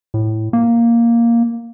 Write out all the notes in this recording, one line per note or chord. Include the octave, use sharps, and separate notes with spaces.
A2
A#3